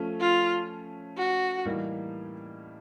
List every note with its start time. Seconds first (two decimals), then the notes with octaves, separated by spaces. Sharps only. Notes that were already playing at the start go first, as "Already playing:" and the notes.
Already playing: F3 A3 C#4
0.20 F4
1.17 F#4
1.65 A2 E3 G3 A#3 D#4